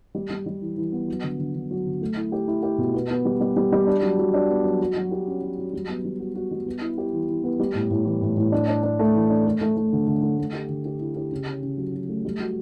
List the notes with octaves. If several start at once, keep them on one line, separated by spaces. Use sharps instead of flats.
G3
G3
G3
E3
E3
B3
F#3
D3
D3
D3
F#3
D3
A3
E4
G4
E4
G4
B2
B3
B3
G3
G3
G3
G3
D4
F#3
F#3
D4
B3
F#3
F#3
F#3
G4
C#4
F#3
F#3
G3
B3
G3
F#4
F#4
G3
B3
E4
G4
E3
E3
B3
G3
A2
A2
E3
A2
A2
D4
D4
D4
A3
E3
D4
A3
A3
A3
D3
D3
A3
A3
G4
D3
G4
E4
G4
C#3
C#4
C#3
F#3
F#3
A3
G3
F#4